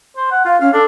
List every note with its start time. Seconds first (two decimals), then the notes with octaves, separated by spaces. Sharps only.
0.17 C5
0.31 F#5
0.45 F4 F5
0.61 C#4 F5
0.73 D4 A4